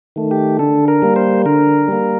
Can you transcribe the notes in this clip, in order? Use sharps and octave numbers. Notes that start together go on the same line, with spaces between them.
D#3 A3
G4
D3 A4
A#4
G3 A#3
C5
D3 A#4
G3 A#3